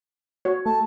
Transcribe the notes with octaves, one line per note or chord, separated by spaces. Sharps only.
F#4 C#5
A3 A5